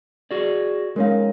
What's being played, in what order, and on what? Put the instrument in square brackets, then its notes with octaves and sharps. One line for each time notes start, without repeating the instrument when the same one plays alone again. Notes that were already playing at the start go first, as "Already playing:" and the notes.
[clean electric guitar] F#4 G#4 D5
[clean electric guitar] G#3 C#4 D#4 [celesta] A#4 C#5 F5